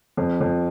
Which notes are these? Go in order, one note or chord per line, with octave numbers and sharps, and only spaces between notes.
F2
F2